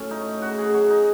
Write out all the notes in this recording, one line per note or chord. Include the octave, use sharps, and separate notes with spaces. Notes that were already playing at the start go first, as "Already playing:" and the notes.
Already playing: A2 F#3 C#4
A3 D#4
C#3 F#4
G#4
F#3 F#4
D#4